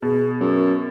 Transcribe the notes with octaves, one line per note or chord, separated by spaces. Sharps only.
B2 G#4
F#2 A#4